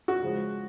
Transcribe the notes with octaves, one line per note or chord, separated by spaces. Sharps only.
F#4
C#3 F3 G#3